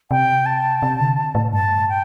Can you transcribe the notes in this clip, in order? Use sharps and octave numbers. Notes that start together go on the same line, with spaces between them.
C3 G5
A5
C3
D3
A2
G2 A5
G5